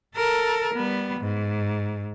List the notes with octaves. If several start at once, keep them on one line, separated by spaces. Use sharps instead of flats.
A4 A#4
G3 B3
G#2